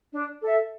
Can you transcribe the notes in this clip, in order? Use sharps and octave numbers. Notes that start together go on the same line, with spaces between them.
D4
A4 E5